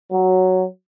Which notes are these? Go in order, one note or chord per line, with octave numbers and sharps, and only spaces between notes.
F#3